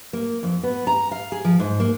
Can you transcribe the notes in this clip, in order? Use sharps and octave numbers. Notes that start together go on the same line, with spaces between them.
A#3
F2
B3
A#5
F5
G#4
F3
G#2
A#3